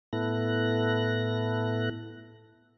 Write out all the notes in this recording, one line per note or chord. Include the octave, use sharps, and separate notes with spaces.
A2 B3 E4 A4 F#6 A#6